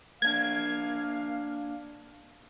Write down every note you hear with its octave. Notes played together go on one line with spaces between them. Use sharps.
A#3 D4 F5 G#6